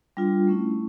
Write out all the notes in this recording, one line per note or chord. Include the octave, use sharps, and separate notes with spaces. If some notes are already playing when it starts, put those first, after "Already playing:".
G3 D4 F4
A3 C#4 E4